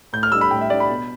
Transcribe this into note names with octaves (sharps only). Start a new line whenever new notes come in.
A2 G6
F6
G3 D4 E6
B5
A2 G5
E5
G3 D4 D5
B5
B2